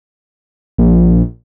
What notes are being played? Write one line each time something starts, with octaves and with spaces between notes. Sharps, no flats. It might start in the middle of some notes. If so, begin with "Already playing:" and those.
A#1